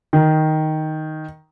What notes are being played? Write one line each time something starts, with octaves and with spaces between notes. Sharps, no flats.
D#3